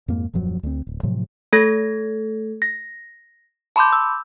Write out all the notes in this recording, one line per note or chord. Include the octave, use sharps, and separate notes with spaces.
F2 G#2 A#3
D#1 F#2 F3 F#3
D2 C4
D1
A2 C3 F3 F#3
A3 A4 G#6 A#6
A#6
A5 B5 C6 D6 G6
E6